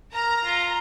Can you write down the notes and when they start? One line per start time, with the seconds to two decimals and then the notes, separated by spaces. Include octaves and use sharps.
0.14 A#4 A#5
0.44 F4